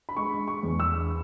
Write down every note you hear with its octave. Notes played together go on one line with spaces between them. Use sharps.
B5
G#3 C#6
C#6
E2
E6